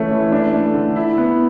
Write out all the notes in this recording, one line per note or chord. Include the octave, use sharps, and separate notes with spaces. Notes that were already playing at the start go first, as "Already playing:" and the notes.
Already playing: E3 A3 C#4
E3
D4
A3
D3
E4
B3